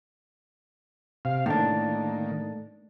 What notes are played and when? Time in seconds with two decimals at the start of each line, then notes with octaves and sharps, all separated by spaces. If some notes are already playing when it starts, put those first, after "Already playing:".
1.25 C3 F5
1.46 A2 D#3 A#3 D4